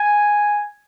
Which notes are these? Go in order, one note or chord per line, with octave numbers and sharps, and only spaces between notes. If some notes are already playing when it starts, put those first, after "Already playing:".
Already playing: G#5